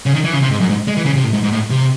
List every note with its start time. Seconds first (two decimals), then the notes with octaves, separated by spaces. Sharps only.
0.06 C#3
0.14 D#3
0.24 E3
0.33 C#3
0.42 C3
0.51 G#2
0.60 F#2
0.70 G#2
0.87 G#3
0.97 E3
1.05 C#3
1.16 C3
1.24 A2
1.33 G#2
1.43 G#2
1.52 A2
1.70 C3